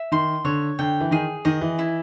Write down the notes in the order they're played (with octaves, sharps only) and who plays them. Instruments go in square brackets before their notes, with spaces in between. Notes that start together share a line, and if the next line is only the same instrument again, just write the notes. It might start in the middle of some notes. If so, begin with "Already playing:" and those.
Already playing: [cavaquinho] E5
[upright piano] D#3 [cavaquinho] C6
[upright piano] D3 [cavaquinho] C#5
[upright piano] D3 [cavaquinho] G5
[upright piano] E3
[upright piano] D#3 [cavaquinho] G#4
[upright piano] D#3 [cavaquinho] D#5
[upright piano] E3
[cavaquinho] E4